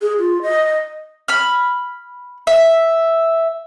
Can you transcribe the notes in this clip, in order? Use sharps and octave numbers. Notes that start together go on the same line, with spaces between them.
G#4
F4
D#5
B5 F6
E5